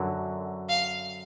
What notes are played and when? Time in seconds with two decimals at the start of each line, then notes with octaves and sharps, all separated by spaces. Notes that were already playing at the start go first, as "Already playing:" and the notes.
Already playing: F#2 D3 F#3
0.69 F5